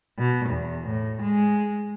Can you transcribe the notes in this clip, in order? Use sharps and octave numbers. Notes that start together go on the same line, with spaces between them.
B2
E2
A2
G#3